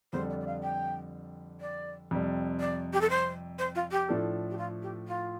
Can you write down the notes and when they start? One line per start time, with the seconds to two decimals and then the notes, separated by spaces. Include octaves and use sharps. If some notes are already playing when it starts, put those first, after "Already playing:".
0.13 F2 D3 G3 D4 A4 C5
0.30 D5
0.40 D5
0.47 F5
0.63 G5
1.61 D5
2.11 F2 C3 G3
2.60 D5
2.93 G4
3.01 A4
3.10 C5
3.59 C5
3.75 F4
3.91 G4
4.09 A2 F3 D4 A4
4.50 G4
4.58 F4
4.82 G4
5.07 F4